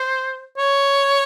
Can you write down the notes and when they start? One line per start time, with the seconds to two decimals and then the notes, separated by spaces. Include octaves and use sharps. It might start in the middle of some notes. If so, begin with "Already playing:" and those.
Already playing: C5
0.58 C#5